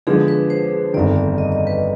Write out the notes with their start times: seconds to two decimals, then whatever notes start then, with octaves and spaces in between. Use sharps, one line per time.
0.07 D3 F3 G#3 B3 D4 G#4
0.28 B4
0.50 C5
0.94 G1 F2 D#3 D5
1.16 D5
1.38 D#5
1.52 D#5
1.67 B4